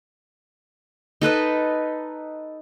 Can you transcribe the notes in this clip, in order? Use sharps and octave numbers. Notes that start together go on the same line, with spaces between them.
D#4 A4 B4 D#5